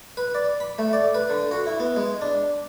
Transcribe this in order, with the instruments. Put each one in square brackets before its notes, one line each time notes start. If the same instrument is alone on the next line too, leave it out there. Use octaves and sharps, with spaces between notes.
[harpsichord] B4
D5
B5
A3
D5
B4
D3
F#4
E4
B3
G#3
D4